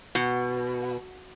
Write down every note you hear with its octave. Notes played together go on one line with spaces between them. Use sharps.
B2